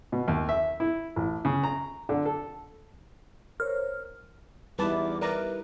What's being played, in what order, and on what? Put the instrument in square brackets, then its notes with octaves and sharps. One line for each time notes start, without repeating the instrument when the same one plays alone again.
[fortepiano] B2
D#2
E5
E4
A1
C#3
A#5
D3
A4
[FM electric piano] A#4 C5 C#5 [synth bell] F6
[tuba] E2 [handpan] G3 D#4 E4 [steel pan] B4 A5 [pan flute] D6
[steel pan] A#4 D5 A#5 [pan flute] B4